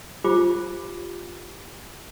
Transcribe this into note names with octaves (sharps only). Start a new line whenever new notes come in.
F4 G4 C5 B5 D6